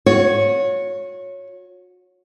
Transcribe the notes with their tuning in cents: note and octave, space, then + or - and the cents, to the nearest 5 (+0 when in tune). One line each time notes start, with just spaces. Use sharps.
F#4 -35 C#5 +0